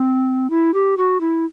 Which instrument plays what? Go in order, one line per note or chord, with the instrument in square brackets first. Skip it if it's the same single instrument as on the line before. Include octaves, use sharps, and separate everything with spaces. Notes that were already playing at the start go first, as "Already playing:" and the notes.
Already playing: [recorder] C4
E4
G4
F#4
E4